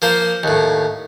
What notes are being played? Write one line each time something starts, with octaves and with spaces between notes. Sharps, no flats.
F3 A#3 C5
D#2 A2